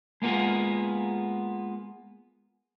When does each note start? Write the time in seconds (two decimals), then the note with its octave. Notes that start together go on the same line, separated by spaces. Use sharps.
0.22 G#3 A#3 B3 F4 G#4